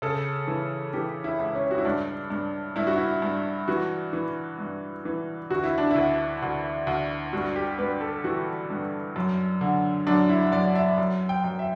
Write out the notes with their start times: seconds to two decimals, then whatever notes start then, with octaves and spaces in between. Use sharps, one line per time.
0.02 C#3 A4
0.47 E3
0.93 E3 G4
1.24 E4
1.39 C#2
1.55 C#4
1.71 F#4
1.78 E4
1.85 G2 D4
2.30 G2
2.76 G2 E4
2.87 F#4
2.98 E4
3.22 G2
3.68 E3 F#4
4.13 E3
4.59 G2
5.05 E3
5.50 D2 F#4
5.63 E4
5.78 D4
5.91 D2 E4
6.42 D2
6.87 D2
7.33 G2 F#4
7.56 G4
7.78 G2 B4
8.01 A4
8.24 E3 F#4
8.70 G2
9.16 F#2
9.61 D3
10.07 F#2 D4
10.29 E4
10.52 F#2 D5
10.75 E5
10.98 F#2
11.29 G5
11.44 F#2
11.59 E5